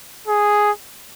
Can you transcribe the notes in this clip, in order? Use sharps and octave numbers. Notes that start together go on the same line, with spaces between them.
G#4